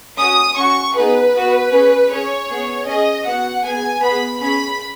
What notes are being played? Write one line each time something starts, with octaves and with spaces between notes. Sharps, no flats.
C#4 F#4 D#6
C#4 F#4 C#6
B3 D#4 G#4 B4
B3 F#4
C#4 G#4
C#4 G#4 C#5
B3 G#4
C#4 G#4 D#5
B3 F#4 F#5
B3 G#4 G#5
B3 G#4 B5
C#4 G#4 B5